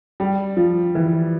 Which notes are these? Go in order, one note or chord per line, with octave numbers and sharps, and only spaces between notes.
G3
F3
E3